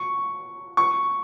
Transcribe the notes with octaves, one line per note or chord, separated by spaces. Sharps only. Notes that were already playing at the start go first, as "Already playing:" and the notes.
Already playing: C#6
C#6